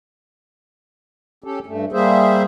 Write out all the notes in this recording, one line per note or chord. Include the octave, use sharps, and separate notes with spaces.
C#4 G4 A4
G2 A3
G3 A#3 G#4 C5 E5